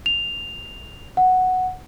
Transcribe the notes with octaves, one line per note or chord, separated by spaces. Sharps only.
F7
F#5